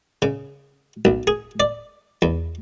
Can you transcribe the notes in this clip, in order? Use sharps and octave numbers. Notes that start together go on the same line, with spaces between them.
C#3
B1
G#4
D5
E2